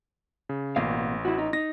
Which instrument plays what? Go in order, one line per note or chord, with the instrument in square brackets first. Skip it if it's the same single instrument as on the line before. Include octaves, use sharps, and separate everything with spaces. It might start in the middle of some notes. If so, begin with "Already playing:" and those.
[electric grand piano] C#3
[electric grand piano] A1 [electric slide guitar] B2 A#3 F5
[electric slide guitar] E4 F#4
D#4
[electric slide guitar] D#4 [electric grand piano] A#6